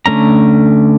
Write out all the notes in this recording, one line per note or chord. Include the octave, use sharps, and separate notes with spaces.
D3 A3 C#4 A#5